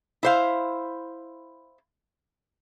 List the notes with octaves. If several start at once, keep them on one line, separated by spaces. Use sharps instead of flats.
E4 C5 F5